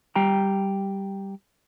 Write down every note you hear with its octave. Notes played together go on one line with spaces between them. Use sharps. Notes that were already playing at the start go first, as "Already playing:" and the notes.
G3 G4 G5 A#5